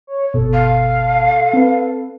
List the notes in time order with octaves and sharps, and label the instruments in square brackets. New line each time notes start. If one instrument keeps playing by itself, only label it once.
[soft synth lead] C#5
[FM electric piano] G1 B2 [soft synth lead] A4
[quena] F5
[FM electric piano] C4 B4